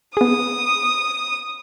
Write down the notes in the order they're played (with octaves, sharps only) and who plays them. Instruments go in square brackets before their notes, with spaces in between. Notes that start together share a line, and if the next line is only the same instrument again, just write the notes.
[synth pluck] B3 G#4 [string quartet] D#6